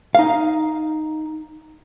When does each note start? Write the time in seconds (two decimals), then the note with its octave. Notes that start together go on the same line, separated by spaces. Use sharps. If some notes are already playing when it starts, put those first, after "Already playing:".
0.15 D#4 F5